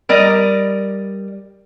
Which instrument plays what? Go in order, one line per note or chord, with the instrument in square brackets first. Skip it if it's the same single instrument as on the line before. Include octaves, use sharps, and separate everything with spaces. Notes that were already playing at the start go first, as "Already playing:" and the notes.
[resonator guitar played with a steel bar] G3 A#4 D5 D#5